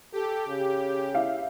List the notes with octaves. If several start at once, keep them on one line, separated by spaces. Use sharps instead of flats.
G4 A4
C#3
E4 E5 F5